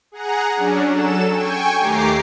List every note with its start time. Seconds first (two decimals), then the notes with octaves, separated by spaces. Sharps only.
0.12 G#4 F#5 A#5
0.55 F#3 C#4 D4
0.90 F#3 A4 E7
1.31 G5 G#5 C#6
1.80 D#2 A3 G4 A#5 D6 C7